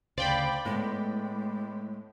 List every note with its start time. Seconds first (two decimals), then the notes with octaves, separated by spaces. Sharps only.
0.18 D2 C#3 C5 D5 F5 G5 B5
0.65 A2 G#3 B3